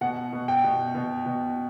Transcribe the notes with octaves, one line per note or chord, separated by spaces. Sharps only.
B2 F#5
B2
G5
B2
B2
B2